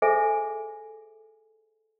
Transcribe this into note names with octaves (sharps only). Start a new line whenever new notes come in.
G#4 A4 C5 E5 G#5